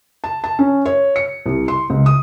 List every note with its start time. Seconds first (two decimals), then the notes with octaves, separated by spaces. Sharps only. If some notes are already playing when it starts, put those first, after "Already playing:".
0.24 A5
0.44 A5
0.59 C#4
0.86 C#5
1.16 C#7
1.46 C2
1.68 C6
1.90 C#2
2.06 D#6